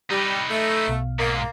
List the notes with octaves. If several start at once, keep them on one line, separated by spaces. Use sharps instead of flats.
G3 D#4 B4 G6
A3
B1 B2 F5
G#2 A#3